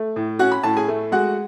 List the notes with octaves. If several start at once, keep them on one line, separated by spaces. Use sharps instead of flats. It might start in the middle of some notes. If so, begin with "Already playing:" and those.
Already playing: A3
A2
C#4 F#4 F#5
B5
A2 A5
G#4 G#5
A3
G#3 F#4 F#5